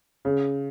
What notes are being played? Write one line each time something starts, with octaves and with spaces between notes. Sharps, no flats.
C#3